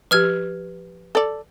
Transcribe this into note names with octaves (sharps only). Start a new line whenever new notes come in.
F3 G4 B4 F6 G#6
A4 D5